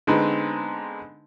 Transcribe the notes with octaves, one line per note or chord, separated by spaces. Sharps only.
D3 G#3 B3 C4 D#4 B4